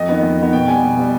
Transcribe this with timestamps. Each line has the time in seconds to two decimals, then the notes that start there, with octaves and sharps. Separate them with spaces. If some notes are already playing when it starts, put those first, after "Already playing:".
Already playing: F2 D#5
0.09 D#3 B3
0.23 F2
0.38 D#3 B3
0.53 B2 G5
0.68 G3 B3 G#5
0.83 B2
0.97 G3 B3